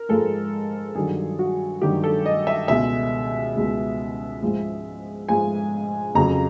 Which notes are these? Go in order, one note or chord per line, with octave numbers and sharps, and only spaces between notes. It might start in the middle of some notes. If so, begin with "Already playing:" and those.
Already playing: A#4
G#2 F3 G#3 A4
G2 D#3 F#3 G#4
F#4
G2 D#3 F#3 G4
A4
D#5
E5
C#2 B2 G#3 E5
C#2 B2 G#3
G#2 F3 G#3
G#2 F3 G#3 G#5
F2 C#3 F#3 A#5